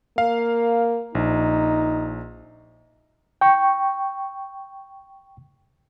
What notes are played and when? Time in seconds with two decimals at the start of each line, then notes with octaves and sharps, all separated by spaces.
0.18 A#3 F5
1.15 A#1 D#4
3.41 G5 C#6